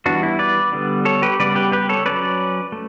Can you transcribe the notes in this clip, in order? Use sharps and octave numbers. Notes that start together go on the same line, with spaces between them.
E3 G3 B3 D4 F#4
E4
B4 D5
D3 G3 B3
A4 C#5
G4 B4
C#3 G3 B3 B4 D5
G4 B4
G4 B4
A4 C#5
F#3 C#4 B4 D5
A3